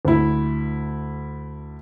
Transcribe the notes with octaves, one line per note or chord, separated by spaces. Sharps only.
D2 E4